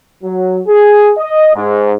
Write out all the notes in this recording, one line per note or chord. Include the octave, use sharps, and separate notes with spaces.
F#3
G#4
D#5
G#2